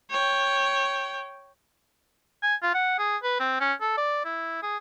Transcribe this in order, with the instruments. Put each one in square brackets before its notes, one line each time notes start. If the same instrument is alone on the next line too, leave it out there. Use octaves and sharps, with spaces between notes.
[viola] C#5 G5
[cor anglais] G#5
F4
F#5
G#4
B4
C4
C#4
A4
D5
E4
G#4